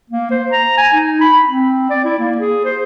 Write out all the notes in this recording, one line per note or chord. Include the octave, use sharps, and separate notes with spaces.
A#3
C5
A#5
G#5
D#4
B5
C4
D5
E4
A#3
G#4
C5